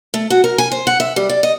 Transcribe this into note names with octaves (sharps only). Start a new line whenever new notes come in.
A3
F#4
A#4
G#5
C5
F#5
E5
G3
D5
D#5